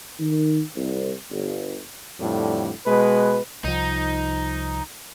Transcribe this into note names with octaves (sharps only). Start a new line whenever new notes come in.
D#3
C2
G1
F2 A2 D3 G3
B2 G#3 B4
C2 F3 D#4